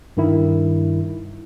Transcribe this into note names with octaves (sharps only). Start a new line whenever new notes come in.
G2 D#3 E4